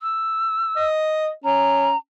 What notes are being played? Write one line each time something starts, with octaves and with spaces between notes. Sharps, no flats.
E6
D#5
C#4 A#5